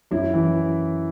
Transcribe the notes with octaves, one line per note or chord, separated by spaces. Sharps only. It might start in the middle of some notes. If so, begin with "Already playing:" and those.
F#2 E4
E3